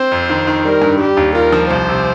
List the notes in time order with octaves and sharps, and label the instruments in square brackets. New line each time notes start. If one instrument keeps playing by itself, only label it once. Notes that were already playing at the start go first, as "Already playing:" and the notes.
Already playing: [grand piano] C4 [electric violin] C5
[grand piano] F2
D#3
D#3
[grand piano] G3 [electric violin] A#4
[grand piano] G2
[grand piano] G3 [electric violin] G4
[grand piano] D#2
[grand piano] F4 [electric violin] A#4
[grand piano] F3
[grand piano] C2 [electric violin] C5
[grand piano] C3